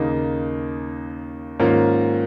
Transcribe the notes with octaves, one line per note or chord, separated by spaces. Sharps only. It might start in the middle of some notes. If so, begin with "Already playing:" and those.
Already playing: D#2 C#3 A#3 D#4
G#2 D#3 A#3 C#4 F4